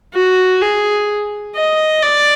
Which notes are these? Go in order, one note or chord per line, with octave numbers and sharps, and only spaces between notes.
F#4
G#4
D#5
D5